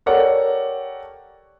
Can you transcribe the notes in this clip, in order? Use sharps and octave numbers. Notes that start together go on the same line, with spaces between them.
G4 A4 A#4 C#5 D5 F#5